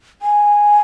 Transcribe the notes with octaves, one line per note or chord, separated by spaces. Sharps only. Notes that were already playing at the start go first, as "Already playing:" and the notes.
G#5